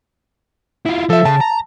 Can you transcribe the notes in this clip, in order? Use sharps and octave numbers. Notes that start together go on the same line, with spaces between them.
E4 F4
F3 A4 E5
C#3 A5
A#5